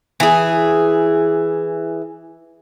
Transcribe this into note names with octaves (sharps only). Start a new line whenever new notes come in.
E3 G#4